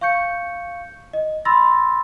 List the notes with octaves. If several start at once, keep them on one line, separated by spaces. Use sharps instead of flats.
F5 C#6 G6 C#7
D#5
B5 C6 E6 A6 A#6